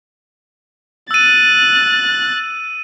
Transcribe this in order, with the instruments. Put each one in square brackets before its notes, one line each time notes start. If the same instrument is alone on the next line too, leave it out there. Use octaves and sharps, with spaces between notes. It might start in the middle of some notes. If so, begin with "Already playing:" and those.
[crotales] E6 D#7 [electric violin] F#6 A6